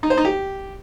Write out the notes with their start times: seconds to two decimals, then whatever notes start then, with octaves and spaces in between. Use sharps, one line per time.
0.03 D#4
0.10 C5
0.17 D#4
0.25 G4